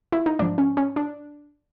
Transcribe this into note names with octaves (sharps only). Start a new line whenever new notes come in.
E4
D#4
G#2 F3 D4
C#4
C#4
D4